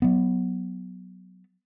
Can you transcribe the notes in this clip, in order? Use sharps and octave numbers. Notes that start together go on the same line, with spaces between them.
F#3 B3